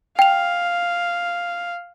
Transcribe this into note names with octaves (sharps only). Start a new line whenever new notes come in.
F5 G5 F7